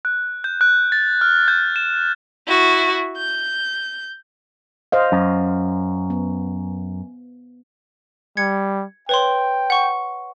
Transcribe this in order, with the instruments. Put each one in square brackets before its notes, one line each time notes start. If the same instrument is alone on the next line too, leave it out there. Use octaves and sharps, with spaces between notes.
[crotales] F#6
G6
F#6
A6
F6
G6
E7
[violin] E4 F#4
G6
[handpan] C5 D#5 F5
[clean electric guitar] F#2
[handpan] B3
[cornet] G3 [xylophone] G#6 C#7
[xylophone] B4 C#5 C6 [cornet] G5
[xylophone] F#5 C#6